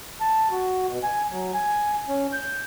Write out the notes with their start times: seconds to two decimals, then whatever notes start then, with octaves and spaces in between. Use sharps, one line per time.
0.21 A5
0.51 F#4
0.89 B2
1.03 G#5
1.31 F#3
1.54 G#5
2.09 C#4
2.33 G6